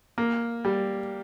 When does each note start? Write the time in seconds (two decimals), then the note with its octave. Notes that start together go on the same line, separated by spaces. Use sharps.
0.18 A#3
0.65 G3